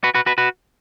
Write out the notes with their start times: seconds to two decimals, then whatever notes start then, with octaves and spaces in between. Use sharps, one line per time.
0.04 F#4 B4
0.15 F#4 B4
0.26 F#4 B4
0.38 F#4 B4